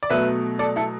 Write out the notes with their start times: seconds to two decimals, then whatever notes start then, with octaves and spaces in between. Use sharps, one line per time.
0.03 D5
0.10 B2 F#3 A3 B4 E5
0.59 A4 D5
0.76 E4 A4